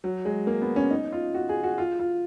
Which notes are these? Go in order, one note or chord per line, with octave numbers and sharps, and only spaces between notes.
F#3
G#3
A#3
B3
C#4
D#4
F4
F#4
G#4
F#4
F4
F4